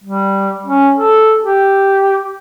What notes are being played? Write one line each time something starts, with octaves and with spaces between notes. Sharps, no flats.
G3
C#4
A4
G4